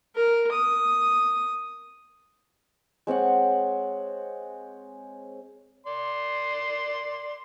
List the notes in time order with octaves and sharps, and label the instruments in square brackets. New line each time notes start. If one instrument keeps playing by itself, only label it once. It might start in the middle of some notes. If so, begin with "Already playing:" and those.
[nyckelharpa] A#4
D#6
[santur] G#3 C4 C#5 F#5
[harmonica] D5 C6